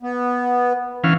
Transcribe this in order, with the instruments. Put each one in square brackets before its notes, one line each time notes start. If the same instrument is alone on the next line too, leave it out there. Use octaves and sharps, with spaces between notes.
[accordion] B3
[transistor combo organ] E3 C#4 F5